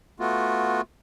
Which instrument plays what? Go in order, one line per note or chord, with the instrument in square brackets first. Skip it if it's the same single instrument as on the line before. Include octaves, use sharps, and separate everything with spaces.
[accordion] A3 B3 F4 F#4